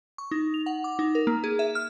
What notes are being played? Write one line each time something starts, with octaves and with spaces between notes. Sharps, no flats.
C#6
D#4
F7
F#5
D6
D#4
A#4
A#3
G#4
E5
F6